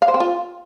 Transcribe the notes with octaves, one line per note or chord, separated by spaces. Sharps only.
F5
C5
C4
F4